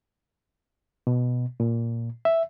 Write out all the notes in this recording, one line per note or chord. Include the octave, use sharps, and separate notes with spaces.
B2
A#2
E5